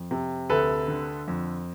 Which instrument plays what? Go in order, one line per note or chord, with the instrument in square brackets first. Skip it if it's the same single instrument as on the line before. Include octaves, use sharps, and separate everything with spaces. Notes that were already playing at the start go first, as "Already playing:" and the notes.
Already playing: [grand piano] F2
C3
D2 A4 B4
D3
F2